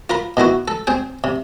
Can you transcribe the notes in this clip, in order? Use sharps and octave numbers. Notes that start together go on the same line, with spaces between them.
F4 A#4 B5
B2 D#3 E4 F#4
A4
C4 G#4 G5
C3